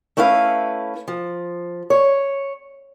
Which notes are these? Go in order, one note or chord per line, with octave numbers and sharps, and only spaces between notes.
A3 C#4 E4 B4 F5
F3
C#5